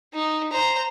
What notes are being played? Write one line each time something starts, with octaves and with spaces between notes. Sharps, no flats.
D#4
C5 A#5